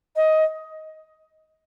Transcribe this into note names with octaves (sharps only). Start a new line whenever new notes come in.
D#5